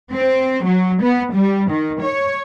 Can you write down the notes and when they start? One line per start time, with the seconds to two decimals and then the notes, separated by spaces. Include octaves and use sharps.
0.13 C4
0.66 F#3
1.02 B3
1.34 G3
1.71 D#3
2.03 C#5